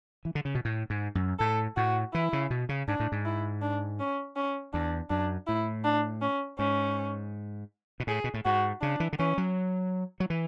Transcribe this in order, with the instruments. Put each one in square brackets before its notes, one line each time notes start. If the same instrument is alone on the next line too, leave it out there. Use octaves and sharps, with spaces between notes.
[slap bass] E3
D3
C#3
B2
A2
G#2
F#2
[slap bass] A2 [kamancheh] A4
[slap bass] A2 [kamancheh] F#4
[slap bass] E3 [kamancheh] E4
[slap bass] C#3
B2
C#3
[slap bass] G#2 [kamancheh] D4
[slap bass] A2
G#2
[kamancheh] E4
D4
C#4
C#4
[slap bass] E2 [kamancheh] D4
[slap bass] F#2 [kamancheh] D4
[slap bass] A2 [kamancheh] E4
[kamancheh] D4
C#4
[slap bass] G#2 [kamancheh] C#4
[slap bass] B2
[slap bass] A2 [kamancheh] G#4
[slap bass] B2
A2
[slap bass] G#2 [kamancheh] F#4
[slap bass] C#3 [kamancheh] D4
[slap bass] E3
D3
[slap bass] E3 [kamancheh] C#4
[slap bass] F#3
F#3
E3